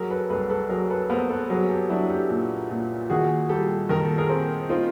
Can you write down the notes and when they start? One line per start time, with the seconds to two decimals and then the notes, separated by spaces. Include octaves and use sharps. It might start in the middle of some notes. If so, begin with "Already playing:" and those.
Already playing: F#3 G#4 A#4
0.10 A4 B4
0.30 C2 A4 B4
0.50 A4 B4
0.69 F#3 G#4 A#4
0.90 A4 B4
1.10 B3 A#4 C5
1.29 A4 B4
1.49 F#3 G#4 A#4
1.69 G4 A4
1.89 F#3 D4 E4
2.09 G4 A4
2.29 A#2
2.70 A#2
3.10 D#3 F#4 G#4
3.49 G3 G4 A4
3.89 D#3 A#4
4.03 A4
4.18 G#4 A#4
4.30 C4
4.69 C4 D#4 F4